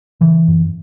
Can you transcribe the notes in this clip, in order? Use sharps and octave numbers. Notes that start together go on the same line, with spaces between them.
C#3 E3
F#2